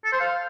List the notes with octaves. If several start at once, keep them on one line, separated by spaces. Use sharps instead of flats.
A4
C5
F5